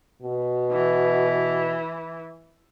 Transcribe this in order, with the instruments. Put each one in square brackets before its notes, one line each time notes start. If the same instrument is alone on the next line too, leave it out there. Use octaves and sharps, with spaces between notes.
[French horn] B2
[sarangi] E3